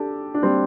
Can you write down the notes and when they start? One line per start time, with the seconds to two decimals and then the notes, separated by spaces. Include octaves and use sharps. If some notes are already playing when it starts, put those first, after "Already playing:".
Already playing: D4 G4 A4
0.34 D4
0.43 G3 C4